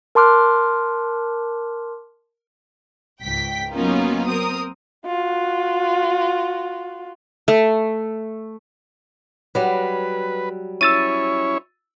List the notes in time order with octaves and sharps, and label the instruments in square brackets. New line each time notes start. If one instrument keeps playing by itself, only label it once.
[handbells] A#4 A5 C6 D6 F6 F#6
[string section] C#2 G#2 G5 B6
F#3 A#3 B3 C#4 D#4 F4
C4 A#4 D#6
[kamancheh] F4 F#4
[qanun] A3
[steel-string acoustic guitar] F#3 G3 [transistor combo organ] B4
[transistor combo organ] C#4 E4 C#5 [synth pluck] E6 A6 D#7